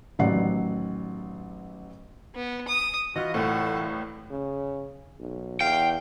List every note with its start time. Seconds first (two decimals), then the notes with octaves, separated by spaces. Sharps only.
0.19 A1 D#3 F#3 D5 F#5 C7
2.35 B3
2.68 D#6
3.16 E3 F4 F#4 B4 D#5
3.34 C2 A2 A4 F#5
4.30 C#3
5.20 B1
5.61 E2 F5 G5